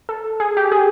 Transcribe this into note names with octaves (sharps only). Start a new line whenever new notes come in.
A4
G#4
G4
G#4